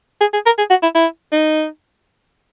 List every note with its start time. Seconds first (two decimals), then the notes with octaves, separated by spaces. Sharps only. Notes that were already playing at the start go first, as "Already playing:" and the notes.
0.21 G#4
0.34 G#4
0.46 A#4
0.59 G#4
0.70 F#4
0.83 E4
0.95 E4
1.32 D#4